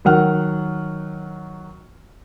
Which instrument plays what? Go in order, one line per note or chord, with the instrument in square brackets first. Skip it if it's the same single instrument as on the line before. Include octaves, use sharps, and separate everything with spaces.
[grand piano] D#3 F#3 F#5 F6